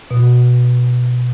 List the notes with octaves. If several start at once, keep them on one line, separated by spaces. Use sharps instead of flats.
B2